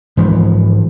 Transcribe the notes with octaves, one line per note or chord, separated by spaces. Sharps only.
G#2 E3 F3